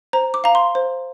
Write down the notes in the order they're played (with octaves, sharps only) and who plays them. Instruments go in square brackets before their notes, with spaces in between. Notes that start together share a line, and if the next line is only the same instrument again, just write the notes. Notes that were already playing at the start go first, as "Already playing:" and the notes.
[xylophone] C5 A#5
D6
F5 A#5
C6
C5